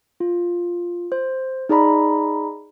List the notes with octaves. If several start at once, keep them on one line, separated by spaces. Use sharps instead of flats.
F4
C5
D#4 G#4 D5 A#5 B5